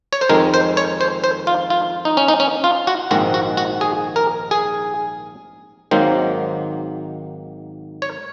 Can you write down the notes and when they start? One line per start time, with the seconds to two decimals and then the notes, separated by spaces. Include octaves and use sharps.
0.13 C#5
0.21 C5
0.29 F2 D#3 G#3 A#4
0.54 C5
0.77 C#5
1.01 C5
1.24 C5
1.47 F4
1.70 F4
2.05 D#4
2.17 C#4
2.28 D#4
2.40 C#4
2.64 F4
2.87 F#4
3.11 A#1 G#2 D#3 G#3 C4 F#4
3.34 F#4
3.57 F#4
3.81 G#4
4.16 A#4
4.51 G#4
5.91 G#1 G#2 D#3 F#3 A#3 C5
8.02 C#5